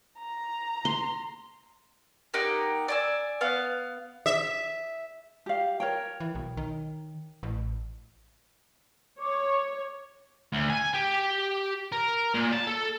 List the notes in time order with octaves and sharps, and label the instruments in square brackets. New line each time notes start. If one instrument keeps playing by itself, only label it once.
[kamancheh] A#5
[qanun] C6
[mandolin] A#3 D#4 G4 F#5
D5 G#5 E6
B3 F5
[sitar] E5
[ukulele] G4 F5
A#4 C#5 G5
[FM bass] E3
B1
D#3
A1
[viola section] C#5 [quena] D6
[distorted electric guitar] D2
G#5
G4
A#4
A#2
A5
A4